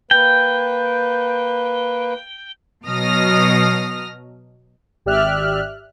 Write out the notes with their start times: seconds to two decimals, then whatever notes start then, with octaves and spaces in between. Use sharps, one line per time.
0.11 A#3 B4 G5
2.86 B2 F#3 D#6 F6 A#6
5.06 G#1 G4 D5 E5 F6 F#6